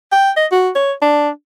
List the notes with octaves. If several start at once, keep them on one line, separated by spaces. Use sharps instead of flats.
G5
D#5
F#4
C#5
D4